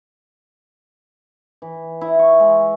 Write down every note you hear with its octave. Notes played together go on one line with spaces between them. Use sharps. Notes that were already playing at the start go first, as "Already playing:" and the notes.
E3
E4
C#6
G#3